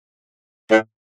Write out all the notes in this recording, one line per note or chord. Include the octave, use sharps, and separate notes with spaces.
A2